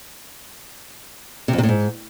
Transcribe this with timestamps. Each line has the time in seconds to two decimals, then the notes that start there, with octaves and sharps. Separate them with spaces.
1.48 C3
1.53 F2
1.58 C3
1.63 A2
1.68 G#2